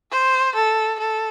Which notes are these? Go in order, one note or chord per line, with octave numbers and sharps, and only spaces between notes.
C5
A4
A4